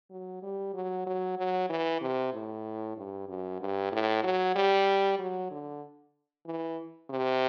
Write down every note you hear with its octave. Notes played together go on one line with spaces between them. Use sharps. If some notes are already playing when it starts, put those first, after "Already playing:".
F#3
G3
F#3
F#3
F#3
E3
C3
A2
G2
F#2
G2
A2
F#3
G3
F#3
D3
E3
C3